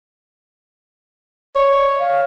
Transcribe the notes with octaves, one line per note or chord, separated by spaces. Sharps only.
C#5 D5
D#5
F5